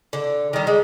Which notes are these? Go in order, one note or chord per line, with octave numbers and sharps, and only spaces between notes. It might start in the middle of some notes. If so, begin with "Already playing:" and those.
D3
D#3 G3
G#3